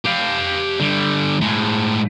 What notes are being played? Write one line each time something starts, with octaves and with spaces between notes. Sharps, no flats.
G4 F5
D3 G3
A2 G#3